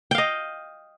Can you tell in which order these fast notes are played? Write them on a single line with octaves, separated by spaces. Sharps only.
G5 F5 D#5